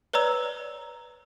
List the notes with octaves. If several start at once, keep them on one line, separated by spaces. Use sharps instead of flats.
B4 C#5 D5 A#5 E6